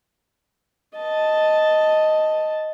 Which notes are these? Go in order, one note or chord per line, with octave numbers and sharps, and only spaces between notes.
D#5 A5